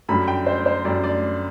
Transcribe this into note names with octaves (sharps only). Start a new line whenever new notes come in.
F#2 D3 G3 B5
G5
C5
C5
F#2 D3 G3 D5
D5